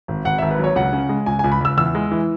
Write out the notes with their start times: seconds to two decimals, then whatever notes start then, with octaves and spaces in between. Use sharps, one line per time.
0.08 G#1
0.25 G#1 F#5
0.38 G#1 E5
0.51 B4
0.59 F#3 C#5
0.76 C#2 F#5
0.93 C#3
1.09 G#3
1.26 C#2 G#5
1.39 G#5
1.44 C#2
1.52 B5
1.61 C#2 E6
1.77 E2 E6
1.95 G#3
2.11 E3